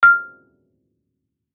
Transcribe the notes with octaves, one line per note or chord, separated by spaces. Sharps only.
F6